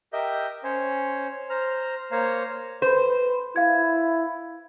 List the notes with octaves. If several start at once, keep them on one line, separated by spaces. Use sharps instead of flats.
G4 A#4 D#5 E5 G6
C#4 C5 C#5
C5 A#5 F6
A#3 C5 C#5 F5 A#5
B4 C5
E4 F5 G#6